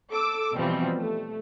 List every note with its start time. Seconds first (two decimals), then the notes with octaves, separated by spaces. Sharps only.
0.11 A4 D6 E6
0.56 B2 E3 F3 G3 C4
0.97 A3